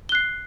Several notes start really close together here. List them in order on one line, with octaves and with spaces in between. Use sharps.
G7 F#6 C7